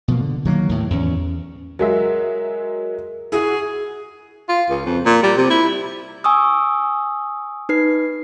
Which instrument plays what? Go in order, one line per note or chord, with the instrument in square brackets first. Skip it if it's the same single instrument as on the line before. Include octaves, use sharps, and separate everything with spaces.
[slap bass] B2 F3 A#3
D3
D#3 F#3 A3 A#3
D#2 A2
E2 C#4
[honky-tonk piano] F#3 G#3 E5 [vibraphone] A#4
[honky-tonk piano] E4 F#4 [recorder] G#4
[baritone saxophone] F4
C#2
F2
A#2
G3
C3
E4
[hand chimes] G#5 C#6 D#6 E6
D#4 B4 C7